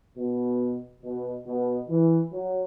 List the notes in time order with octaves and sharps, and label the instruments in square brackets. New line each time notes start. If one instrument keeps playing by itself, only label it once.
[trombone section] B2
B2
B2
E3
F#3